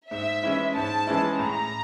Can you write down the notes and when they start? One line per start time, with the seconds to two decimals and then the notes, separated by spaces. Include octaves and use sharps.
0.11 G#2 E5
0.43 E3 G#3 C#4 E4
0.75 G#2 A5
1.07 E3 G#3 C#4 E4
1.38 A2 A#5